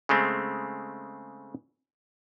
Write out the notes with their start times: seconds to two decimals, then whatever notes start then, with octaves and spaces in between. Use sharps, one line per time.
0.09 C#3 G#3 A3 C4